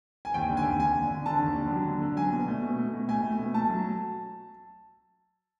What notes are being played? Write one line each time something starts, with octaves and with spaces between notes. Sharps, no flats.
G#5
D#2 G5
D3
G#5
D#2
D#2 G#5
D3
D3
D3 A5
D#2
D3
F#3
D3
D3
F#3 G#5
B2
A3
B2
A3
B2
A3 G#5
A3
B2
A3 A5
F#3